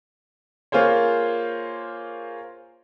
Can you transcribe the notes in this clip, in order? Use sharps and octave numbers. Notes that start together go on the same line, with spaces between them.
A#3 F4 G#4 C5 C#5